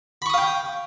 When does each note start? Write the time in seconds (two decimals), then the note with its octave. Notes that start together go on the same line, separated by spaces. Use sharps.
0.22 B5
0.26 C#6
0.30 D#6
0.34 F5
0.38 G5